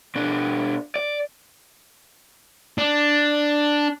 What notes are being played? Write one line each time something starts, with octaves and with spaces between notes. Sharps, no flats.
B2 D4
D5
D4